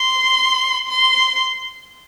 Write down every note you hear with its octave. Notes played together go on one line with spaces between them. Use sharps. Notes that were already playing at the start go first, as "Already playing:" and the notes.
Already playing: C6
C6